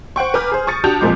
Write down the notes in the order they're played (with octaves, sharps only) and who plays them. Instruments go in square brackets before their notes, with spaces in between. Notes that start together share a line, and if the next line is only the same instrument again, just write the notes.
[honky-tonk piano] C5 F#5 G5 C#6
B4 G#5 A#5 D6 F6 G6
G#4 C5
C#6 D#6 A6 C#7
D4 F#4 G4 A5 G6 F7
F2 A#2 F3 G#3 D6